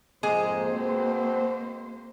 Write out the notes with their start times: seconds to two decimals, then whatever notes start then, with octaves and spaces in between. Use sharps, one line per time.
0.23 F2 G#2 G#3 A#3 G#4 C5
0.70 B2 C4